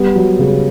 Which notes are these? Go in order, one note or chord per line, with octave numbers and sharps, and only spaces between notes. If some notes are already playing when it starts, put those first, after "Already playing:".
Already playing: G3 B3
F#3
C#3